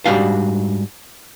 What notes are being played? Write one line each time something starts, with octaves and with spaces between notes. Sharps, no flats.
G#2 D#3 G3 D4 F#4 F5